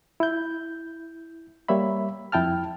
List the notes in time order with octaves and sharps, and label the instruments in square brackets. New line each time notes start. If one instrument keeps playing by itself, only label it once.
[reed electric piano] E4 G6
G3 A#3 C#5 E5 B5
F2 E4 G5 A5 F6